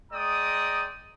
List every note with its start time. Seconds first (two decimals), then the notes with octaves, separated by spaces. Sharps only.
0.12 G#3 D5 G5 A#5 D#6